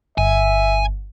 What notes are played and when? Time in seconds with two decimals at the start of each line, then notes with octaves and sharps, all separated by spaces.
0.18 G1 E5 G#5